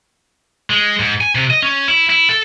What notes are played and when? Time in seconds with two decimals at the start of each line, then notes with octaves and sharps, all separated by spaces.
0.70 G#3
1.00 G#2
1.21 G#5
1.35 C3
1.50 D#5
1.62 C#4
1.88 E4
2.09 E4
2.29 A4